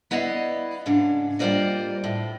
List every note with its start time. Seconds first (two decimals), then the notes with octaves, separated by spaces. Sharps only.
0.11 B3 E4 D5 D#5 F5
0.86 G#2 C#3 D4
1.39 G3 A#3 F4 C5 D5 D#5
2.04 A2